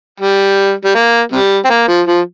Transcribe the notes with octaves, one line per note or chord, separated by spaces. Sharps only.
G3
G3
A#3
C3 G3
C4
A#3
F3
F3